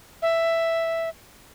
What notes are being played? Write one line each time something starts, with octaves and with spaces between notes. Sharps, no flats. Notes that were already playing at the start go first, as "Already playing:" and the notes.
E5